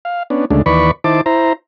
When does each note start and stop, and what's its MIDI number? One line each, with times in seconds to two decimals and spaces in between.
0.05 0.23 77
0.30 0.45 59
0.30 0.45 61
0.30 0.45 62
0.50 0.62 38
0.50 0.62 49
0.50 0.62 56
0.50 0.62 57
0.50 0.62 62
0.66 0.91 39
0.66 0.91 52
0.66 0.91 71
0.66 0.91 74
0.66 0.91 83
0.66 0.91 85
1.04 1.21 51
1.04 1.21 64
1.04 1.21 72
1.04 1.21 81
1.04 1.21 86
1.26 1.53 64
1.26 1.53 72
1.26 1.53 82